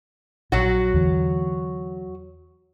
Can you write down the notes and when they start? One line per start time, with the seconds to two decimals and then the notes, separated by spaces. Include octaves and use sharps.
0.52 A#1 F#3 F#4
0.94 E2 D3